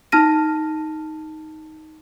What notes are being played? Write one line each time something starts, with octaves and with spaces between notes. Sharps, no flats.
D#4 A5 F6 A#6 D#7